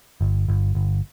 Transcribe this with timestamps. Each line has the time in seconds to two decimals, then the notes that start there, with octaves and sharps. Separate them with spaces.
0.21 G1
0.48 G1
0.75 G1